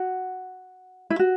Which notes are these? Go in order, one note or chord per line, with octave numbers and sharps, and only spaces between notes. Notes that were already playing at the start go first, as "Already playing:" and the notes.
Already playing: F#4
E4
F#4